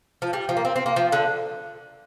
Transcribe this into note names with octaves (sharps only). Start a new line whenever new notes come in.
F3
G3
F3
A#3
C4
C4
A#3
F3
D3